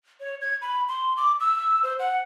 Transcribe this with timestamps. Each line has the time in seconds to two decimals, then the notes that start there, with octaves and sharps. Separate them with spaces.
0.20 C#5
0.41 G#6
0.62 B5
0.88 C6
1.17 D6
1.40 E6
1.83 C5
1.99 F#5